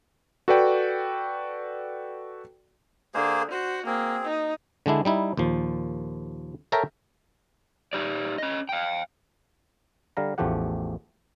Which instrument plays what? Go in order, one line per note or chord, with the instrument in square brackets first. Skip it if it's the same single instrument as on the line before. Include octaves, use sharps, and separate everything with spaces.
[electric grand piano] F#4 A4 B4 D5 G5
[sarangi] D3 [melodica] A#3 G#4 C5
[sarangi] F#4 [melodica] C5
[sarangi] A#3 [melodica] C4 G#4
[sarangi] D#4
[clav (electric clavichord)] D3 G#3 D4 E4
G3 D#4 E4
D#2 A#2 F3
A4 A#4 C#5 E5 G5 A#5
[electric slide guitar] D#4 G4 D5
C#4 D#5
F5 G5
[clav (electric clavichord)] D3 G3 F5 A#5
A1 E2 F3 A3 G4 F#5